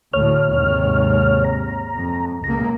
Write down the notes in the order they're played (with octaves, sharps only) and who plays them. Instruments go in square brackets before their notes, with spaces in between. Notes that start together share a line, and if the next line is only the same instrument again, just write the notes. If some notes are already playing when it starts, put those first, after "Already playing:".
[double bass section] D2 A2 [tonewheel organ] C#5 F6
[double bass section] D#2 G#2 C3
[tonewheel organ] A#5
[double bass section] F2
[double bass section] C#2 A#3 [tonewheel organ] A#5